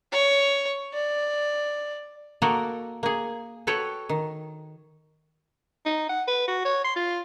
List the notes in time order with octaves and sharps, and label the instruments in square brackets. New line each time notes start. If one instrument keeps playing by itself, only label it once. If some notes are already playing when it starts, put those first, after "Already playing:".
[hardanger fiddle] C#5
D5
[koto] A#3 F#4 A4 A#4 D5 D#5
A#3 G#4
F#4 A4 B4 C#5 G5
D#3
[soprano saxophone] D#4
F#5
B4
F#4
C#5
C6
F4